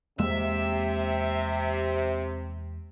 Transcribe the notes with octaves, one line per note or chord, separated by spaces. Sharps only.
E2 C3 G#3 A#3 E5